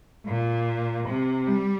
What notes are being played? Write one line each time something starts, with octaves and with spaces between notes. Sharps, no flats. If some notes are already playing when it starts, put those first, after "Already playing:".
A#2
C3
G3